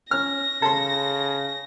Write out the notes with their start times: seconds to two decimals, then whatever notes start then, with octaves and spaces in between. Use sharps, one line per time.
0.11 C#4 F6 A#6
0.62 C#3 A4 C6